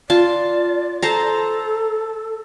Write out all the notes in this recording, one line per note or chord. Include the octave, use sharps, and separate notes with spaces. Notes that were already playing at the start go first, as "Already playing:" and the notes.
F4 D5 A5
A4 C5 A5 A#5